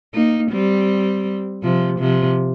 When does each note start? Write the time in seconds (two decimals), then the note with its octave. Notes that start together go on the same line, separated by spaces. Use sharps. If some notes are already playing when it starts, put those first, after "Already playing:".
0.14 A#3 D#4
0.51 G3 C4
1.63 C3 F3
2.00 C3 F3